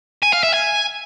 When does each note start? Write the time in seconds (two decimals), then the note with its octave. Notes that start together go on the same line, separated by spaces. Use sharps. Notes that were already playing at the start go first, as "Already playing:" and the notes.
0.23 G#5
0.33 F5
0.43 E5
0.53 G#5